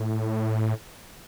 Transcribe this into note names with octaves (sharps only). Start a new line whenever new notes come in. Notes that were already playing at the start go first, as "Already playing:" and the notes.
Already playing: A2